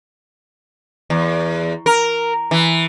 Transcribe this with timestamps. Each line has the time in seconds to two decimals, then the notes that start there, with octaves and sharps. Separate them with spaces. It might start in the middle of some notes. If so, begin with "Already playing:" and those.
1.10 E2
1.86 A#4
2.51 E3